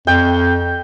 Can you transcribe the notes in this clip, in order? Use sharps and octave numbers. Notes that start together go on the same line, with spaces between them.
F2 G5